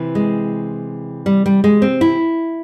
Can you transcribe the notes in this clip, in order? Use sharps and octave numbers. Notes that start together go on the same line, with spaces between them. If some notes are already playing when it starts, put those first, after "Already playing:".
Already playing: C3 E3
G#3
G3
G3
G#3
C4
E4